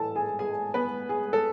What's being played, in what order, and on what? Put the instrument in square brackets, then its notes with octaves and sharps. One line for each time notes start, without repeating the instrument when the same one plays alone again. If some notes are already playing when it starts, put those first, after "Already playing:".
Already playing: [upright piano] A2 E3 A4 A5
G#4 G#5
G#4 G#5
B3 B4
G#4
A4